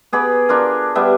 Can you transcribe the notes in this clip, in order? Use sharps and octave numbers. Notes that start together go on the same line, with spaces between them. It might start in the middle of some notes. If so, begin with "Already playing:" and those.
B3 G#4 B5 D6
D4 F4 A#4
G3 B3 E5